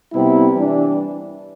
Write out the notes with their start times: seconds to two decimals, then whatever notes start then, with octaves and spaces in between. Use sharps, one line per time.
0.11 C3 G3 B3 E4
0.56 E3 G3 D4